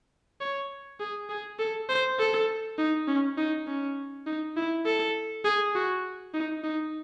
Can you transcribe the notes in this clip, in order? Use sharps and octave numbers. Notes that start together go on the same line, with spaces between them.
C#5
G#4
G#4
A4
C5
A4
D#4
C#4
D#4
C#4
D#4
E4
A4
G#4
F#4
D#4
D#4